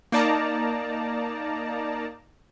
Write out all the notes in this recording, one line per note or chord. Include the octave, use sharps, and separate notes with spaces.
A#3 D#4 D5 A5 A#5